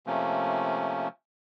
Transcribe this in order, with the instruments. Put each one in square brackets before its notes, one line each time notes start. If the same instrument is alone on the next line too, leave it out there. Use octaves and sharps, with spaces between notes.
[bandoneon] C3 F3 A3 A#3 C#4